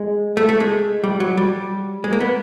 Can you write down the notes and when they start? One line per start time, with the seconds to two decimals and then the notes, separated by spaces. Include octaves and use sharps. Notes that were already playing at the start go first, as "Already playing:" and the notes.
Already playing: G#3
0.37 A3
0.49 A3
0.60 G#3
1.04 G3
1.20 F#3
1.37 G3
2.04 G#3
2.13 A#3
2.20 B3